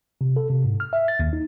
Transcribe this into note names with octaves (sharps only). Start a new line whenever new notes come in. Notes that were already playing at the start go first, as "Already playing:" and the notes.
C3
A4
C3
G#2
F6
E5
A6
D#2
D#4